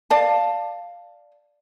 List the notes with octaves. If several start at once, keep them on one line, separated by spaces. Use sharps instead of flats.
D5 F5 A5